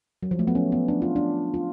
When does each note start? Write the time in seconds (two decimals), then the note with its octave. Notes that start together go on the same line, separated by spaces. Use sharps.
0.23 F#3
0.31 F3
0.39 A3
0.47 B3
0.55 C#4
0.72 B3
0.88 D4
1.02 F4
1.16 D4
1.54 F4